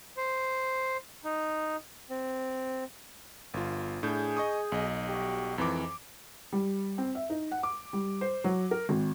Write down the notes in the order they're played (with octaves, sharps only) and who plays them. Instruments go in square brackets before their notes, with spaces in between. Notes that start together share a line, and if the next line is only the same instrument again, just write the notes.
[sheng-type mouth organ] C5
D#4
C4
[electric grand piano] G1 F4
[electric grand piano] A2 D4 G6 [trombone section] G#4
[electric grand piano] D#5 C#6 D#6
B1 D#5
[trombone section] G3 F#4 G4
[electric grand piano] F2 E3 D6 [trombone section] G#2 D#3
[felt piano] G3
C4
E5
D#4
F#5
D6
G3
C5
F#3
A#4
G#1